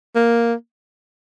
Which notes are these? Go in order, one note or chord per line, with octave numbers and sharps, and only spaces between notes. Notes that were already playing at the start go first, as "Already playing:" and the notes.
A#3